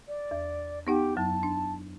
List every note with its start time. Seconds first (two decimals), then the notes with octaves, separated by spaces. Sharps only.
0.08 D5
0.31 E2
0.87 B3 D#4 G4 F#5
1.17 F#2 F#3 A5
1.43 D4